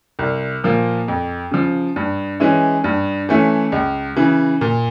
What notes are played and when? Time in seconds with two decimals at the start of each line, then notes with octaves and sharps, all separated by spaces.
0.19 C2
0.64 A#2 F3 A#3
1.08 F2
1.51 C#3 F3
1.96 G2
2.40 E3 G#3 C#4 E4
2.84 G2
3.29 E3 A3 C#4 E4
3.72 C#2
4.16 C#3 E3
4.61 A#2